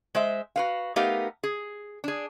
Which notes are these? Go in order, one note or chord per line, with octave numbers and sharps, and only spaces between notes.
G#3 C5 E5
F#4 B4 F5
A3 B3 D#4 G4 A#4 F5
G#4
D4 G#4